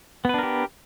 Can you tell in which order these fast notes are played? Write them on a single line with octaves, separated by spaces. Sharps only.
B3 B4 D4 A#4 G4